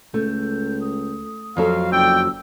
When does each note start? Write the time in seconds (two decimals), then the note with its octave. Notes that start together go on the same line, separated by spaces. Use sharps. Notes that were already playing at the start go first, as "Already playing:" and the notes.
0.14 C#2 A3 G6
0.81 D#6
1.57 F2 F3 F#3 A4 F5
1.92 F#1 D5 G5 E6